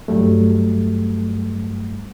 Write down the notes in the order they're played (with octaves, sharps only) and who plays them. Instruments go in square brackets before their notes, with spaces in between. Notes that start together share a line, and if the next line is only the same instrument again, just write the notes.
[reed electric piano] G2 F#3 G3 A3